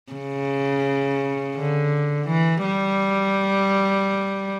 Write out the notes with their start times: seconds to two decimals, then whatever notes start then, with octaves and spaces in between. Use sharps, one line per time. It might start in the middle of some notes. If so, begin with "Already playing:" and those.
0.13 C#3
1.56 D3
2.28 E3
2.64 G3